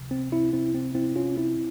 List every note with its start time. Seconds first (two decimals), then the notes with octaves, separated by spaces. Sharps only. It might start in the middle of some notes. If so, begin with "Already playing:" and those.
Already playing: C#2 C3 F3
0.11 C4
0.32 C4 E4
0.53 C4 E4
0.74 C4
0.95 C4 E4
1.16 C#4 F4
1.37 C4 E4